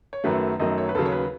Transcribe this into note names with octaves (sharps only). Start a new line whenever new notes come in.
C#5
F#2 D#3 F#3 A3 B4
F#2 D#3 F#3 A3 D#5
C#5
B4
D#2 C#3 F#3 A4
C#5
B4